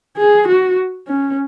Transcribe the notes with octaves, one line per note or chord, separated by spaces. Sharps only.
G#4
F#4
C#4